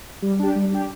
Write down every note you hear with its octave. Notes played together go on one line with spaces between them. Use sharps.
G3
D4 G4
G3
D4 G4